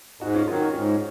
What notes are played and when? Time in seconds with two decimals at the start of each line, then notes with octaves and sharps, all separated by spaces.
0.21 G#2 D#4 F#4
0.35 C#4 F4
0.48 D#3 F#3 C#4 F4
0.61 C#4 F4
0.74 G#2 C#4 F4